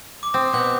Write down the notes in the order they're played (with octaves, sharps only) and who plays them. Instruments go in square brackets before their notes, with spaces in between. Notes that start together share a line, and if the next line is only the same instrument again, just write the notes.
[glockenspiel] D6
[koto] C4 [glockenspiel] D#6
[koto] B2 [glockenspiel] G6